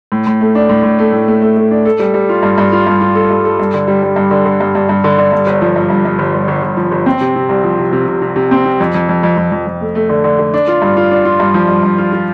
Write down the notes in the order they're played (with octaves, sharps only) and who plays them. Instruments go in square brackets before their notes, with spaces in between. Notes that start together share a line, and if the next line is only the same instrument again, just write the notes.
[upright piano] A2
A2
A3
D4
A2
A2
A3
A2
A3
A3
A3
D4
A4
G3
G3
F4
G2
G2
F4
G2
F4
A4
G2
A4
G2
D3
G3
G3
G2
D3
D3
G2
G2
G2
D3
D3
G2
G1
F3
G2
G2
G2
G1
G1
G1
G1
F3
G1
C4
C3
C3
C2
F3
C3
C3
C3
C3
C3
C4
C3
F2
F2
F2
F2
F2
F2
F2
A3
A3
D3
D3
D3
D4
F4
G2
F4
D4
F4
G2
F3
G2
G2
F4
F4